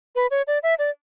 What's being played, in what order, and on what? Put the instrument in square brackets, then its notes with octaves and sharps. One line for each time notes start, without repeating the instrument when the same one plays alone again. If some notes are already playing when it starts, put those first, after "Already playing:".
[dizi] B4
C#5
D5
E5
D5